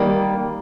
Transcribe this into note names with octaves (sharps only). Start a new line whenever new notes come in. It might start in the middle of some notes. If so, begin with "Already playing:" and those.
Already playing: D#3 G3 A#3